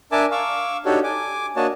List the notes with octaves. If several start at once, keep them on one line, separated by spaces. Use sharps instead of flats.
D4 A#4 E5 G#5 A5 D6
F5 C#6 D6 E6
D4 D#4 F#4 G4 A4 C#5
G#5 D6
A#3 D4 F#4 C#5 D#5 A5